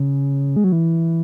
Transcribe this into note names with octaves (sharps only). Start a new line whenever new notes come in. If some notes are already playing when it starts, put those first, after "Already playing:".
Already playing: C#3
G#3
F#3
E3